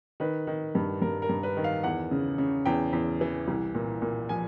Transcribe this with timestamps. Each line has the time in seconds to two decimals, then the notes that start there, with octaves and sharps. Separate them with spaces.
0.20 D#3 B4
0.47 D#3
0.75 G2
1.02 G2 A#4
1.22 A#4
1.29 G2
1.43 B4
1.57 D#3
1.64 F5
1.84 E2 F#5
2.11 C#3
2.38 C#3
2.66 E2 G5
2.93 E2
3.21 E3
3.47 C2
3.75 A#2
4.02 A#2
4.29 F3 G#5